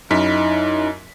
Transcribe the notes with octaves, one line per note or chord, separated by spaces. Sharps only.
F#2 D#4 E4 B6